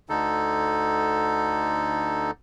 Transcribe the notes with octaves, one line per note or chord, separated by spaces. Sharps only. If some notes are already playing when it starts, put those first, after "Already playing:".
D2 D3 D#4 A4